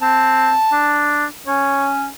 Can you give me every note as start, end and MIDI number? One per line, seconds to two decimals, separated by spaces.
0.02 0.54 60
0.02 1.05 81
0.72 1.25 62
1.47 2.08 61
1.47 1.89 73